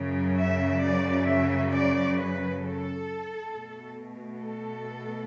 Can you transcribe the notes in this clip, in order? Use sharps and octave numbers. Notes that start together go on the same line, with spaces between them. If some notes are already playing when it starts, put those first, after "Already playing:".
Already playing: F#2 C#3 F#3
E5
D5
E5
D5
B4
A4
B2 A3
A4